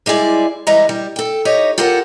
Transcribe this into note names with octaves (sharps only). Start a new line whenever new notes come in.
G3 G#3 E4 G#4 D5
E3 G3 G#3 D#5 A#5
G3
A4 G5
D#4 G4 C#5 D#5
F4 G4 A4 A#4 F#5